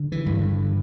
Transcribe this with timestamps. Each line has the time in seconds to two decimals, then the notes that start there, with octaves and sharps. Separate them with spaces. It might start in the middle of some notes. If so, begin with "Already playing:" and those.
Already playing: D3
0.12 E3
0.26 G2
0.40 D3